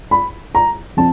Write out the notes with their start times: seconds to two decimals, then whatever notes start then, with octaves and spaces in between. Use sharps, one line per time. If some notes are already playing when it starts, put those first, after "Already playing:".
0.11 B5
0.55 A#5
0.97 F3 C4 A5